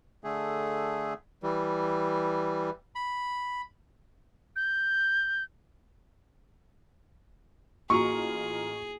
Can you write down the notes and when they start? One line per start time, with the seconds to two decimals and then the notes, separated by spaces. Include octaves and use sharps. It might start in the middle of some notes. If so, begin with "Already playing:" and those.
0.24 D3 A3 G#4
1.43 E3 G3
2.95 B5
4.56 G6
7.90 A1 A#3 F4 F#4 G#4 A#5 C#6